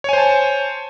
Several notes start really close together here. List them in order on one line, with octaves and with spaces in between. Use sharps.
C#5 G#5 C5 A5